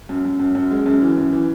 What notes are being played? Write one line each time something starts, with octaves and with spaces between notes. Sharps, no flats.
F#2
F#2
F#2
F#2
G#3
F#2
E3
F#2
E3